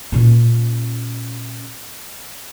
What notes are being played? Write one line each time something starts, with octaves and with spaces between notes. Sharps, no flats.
A#2 C#4